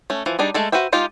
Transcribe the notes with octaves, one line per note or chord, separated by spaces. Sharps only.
A3 C#4
E3 F3
G3 D4 D#4 G#4
G#3 A3 A4
F#4 B4 C5 E5 G5
G#3 D#4 F4 G4